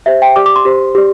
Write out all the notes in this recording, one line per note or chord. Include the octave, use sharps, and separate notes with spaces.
G4 C5 E5
G5
G4 D5 D6
D6
C6
G4 C5
G4 D5